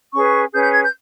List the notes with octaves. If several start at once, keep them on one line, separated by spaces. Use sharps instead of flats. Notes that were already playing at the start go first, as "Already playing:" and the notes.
C#4 G#4 B4 C#6
C#4 G#4 B4 G6
G6
G#6
G6